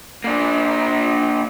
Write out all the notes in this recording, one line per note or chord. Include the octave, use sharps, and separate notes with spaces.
A#3 D4